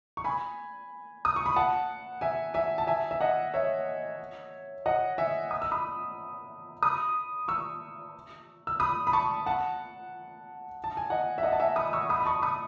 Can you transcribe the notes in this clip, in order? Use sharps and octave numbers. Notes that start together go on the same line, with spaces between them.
C#6
G#5 B5
D#6
C#6
B5
F#5 A5
E5 G#5
E5 G#5
A5
E5 G#5
E5
D#5 F#5
C#5 E5
D#5 F#5
E5 G#5
D#6
E6
B5 D#6
B5 D#6
C#6 E6
E6
B5 D#6
B5
A5 C#6
F#5 A5
A5
G#5
D#5 F#5
E5
D#5 F#5
A5
E5 G#5
B5 D#6
C#6 E6
B5 D#6
B5
A5 C#6
B5 D#6